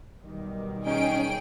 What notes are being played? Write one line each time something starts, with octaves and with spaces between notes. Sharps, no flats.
B1 D#3 G3
C#4 D#4 G#4 G5 D7